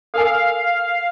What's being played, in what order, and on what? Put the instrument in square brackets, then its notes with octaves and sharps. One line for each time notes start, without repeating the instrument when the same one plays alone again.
[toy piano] A4 A#4 G#5 [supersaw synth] F5